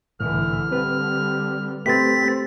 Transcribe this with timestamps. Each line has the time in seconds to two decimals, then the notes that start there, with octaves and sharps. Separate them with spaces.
0.20 C2 A2 D3 E3 F6
0.71 D3 G3 C4 B4
1.86 A3 C4 G4 B4 A6 B6